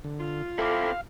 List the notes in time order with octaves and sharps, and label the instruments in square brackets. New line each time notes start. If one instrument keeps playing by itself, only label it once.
[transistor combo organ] D3
[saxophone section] F4
[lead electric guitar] C4 E4 [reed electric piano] A4 D6 [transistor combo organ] F5